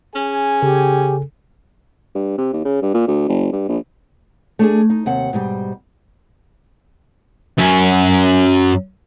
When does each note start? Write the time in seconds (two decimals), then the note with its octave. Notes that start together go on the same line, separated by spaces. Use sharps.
0.14 C#4 G#4 G#5
0.62 C#3 G4 A4
2.15 G2
2.38 C3
2.53 D#2
2.65 C#3
2.82 G2
2.94 A#2
3.07 D2
3.28 F#1
3.53 G2
3.68 A#1
4.59 A3 D4 G#4
4.90 D#4
5.06 D#2 C3 F#5
5.33 G#2 B2 G3
7.58 F#2 C#4